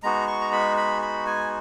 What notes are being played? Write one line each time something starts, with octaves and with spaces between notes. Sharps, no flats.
G#3 B3 D#4 F#4 A#5
C#6
A#5
B5
B5
B5
G#5